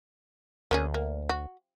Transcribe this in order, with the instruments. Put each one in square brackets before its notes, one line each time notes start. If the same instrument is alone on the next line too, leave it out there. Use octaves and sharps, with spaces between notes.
[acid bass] D2 [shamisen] A#3 C#4 G#4
[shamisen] A#3
F#4